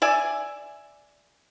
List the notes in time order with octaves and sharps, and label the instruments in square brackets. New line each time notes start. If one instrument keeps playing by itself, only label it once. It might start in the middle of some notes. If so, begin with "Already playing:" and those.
[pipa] D5 E5 G#5